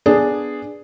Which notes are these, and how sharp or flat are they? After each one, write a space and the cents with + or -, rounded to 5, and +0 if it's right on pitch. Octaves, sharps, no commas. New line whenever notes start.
B3 +0 D4 +0 G#4 -5